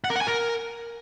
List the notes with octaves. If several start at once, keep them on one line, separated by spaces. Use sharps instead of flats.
F#5
A#4
F#5
G#5
A#4